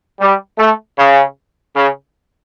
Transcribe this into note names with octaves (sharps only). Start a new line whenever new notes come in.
G3
A3
C#3
C#3